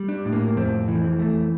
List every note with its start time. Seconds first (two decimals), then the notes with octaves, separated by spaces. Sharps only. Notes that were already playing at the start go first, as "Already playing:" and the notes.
Already playing: G3
0.08 D4
0.25 A2
0.32 A#3
0.56 F2 C4
0.88 E3
1.19 A3